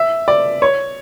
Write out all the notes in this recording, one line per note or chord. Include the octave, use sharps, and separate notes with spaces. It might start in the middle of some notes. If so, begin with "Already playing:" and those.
Already playing: E5
D5
C#5